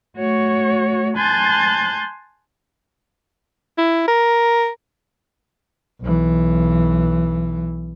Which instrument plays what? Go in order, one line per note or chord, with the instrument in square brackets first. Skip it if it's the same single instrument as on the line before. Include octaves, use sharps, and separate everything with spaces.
[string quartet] A3 F#4 C#5
G#5 A5 C6 F#6 G6 A6
[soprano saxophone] E4
A#4
[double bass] B1 E3